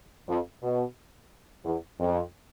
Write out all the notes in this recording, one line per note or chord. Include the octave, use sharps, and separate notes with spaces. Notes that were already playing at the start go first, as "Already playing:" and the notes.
F2
B2
E2
F2